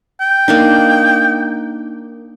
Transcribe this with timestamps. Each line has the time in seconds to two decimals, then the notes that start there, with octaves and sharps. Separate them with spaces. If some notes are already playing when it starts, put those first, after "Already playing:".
0.21 G5
0.48 A#3 D4 D#4